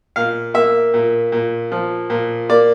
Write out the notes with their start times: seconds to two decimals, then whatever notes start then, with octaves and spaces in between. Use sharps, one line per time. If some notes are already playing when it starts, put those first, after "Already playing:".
0.16 A#2 F5
0.54 A#3 E5
0.94 A#2
1.32 A#2
1.72 F3
2.10 A#2
2.49 A#3 D5